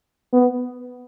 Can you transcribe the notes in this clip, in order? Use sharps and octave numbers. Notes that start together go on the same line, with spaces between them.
B3